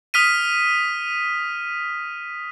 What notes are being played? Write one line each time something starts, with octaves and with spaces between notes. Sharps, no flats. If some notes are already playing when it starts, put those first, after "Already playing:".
D#6 F6 B6 D#7